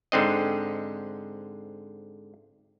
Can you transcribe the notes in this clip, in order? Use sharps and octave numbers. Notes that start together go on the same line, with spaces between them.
G#2 D3 C4 D#5